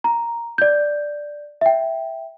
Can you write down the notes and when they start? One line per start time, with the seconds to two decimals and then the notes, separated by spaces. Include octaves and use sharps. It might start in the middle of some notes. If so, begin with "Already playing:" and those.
0.04 A#5
0.58 D5 G6
1.61 E5 G5